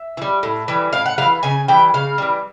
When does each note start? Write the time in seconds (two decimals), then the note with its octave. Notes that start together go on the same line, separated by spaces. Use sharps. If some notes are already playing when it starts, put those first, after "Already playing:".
Already playing: E5
0.17 E3
0.22 G3
0.43 A2
0.68 E3 G3
0.93 A2 F5
1.06 F#5
1.18 G3 F5
1.22 E3
1.43 C#3 G#5
1.68 E3 G3 G5
1.94 C#3 F5
2.18 E3 G3